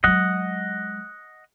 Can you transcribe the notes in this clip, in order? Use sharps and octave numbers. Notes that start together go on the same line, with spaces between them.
F#3 G#3 D#5 F#5